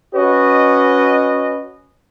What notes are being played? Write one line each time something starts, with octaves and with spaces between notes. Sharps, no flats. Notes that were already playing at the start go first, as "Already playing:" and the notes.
C#4 F#4 B4 C#5 D#5